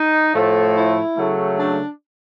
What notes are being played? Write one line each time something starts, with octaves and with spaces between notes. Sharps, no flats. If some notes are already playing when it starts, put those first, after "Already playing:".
Already playing: D#4
A2 F3 A3
E4
C#3 F#3 A3
D4